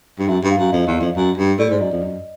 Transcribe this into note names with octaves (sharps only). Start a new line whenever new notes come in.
G2
F#2 E5
G2
F5
F#2
F2 D#5
E2 D#5
D5
F2
F#2
G2
A2 D5
G#2
F#2 D#5
F2
F#2 D#5